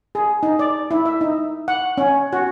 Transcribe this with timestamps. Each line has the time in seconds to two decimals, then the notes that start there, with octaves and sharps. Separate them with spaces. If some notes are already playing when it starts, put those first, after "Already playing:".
0.15 G#4
0.43 D#4
0.59 D5
0.91 E4
1.06 E5
1.21 D#4
1.68 F#5
1.98 C#4
2.33 F#4